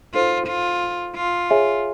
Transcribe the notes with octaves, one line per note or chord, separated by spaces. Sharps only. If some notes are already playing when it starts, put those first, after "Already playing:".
D#4 F4 F#4 A4 C5
F4
F4
G#4 C#5 E5 G#5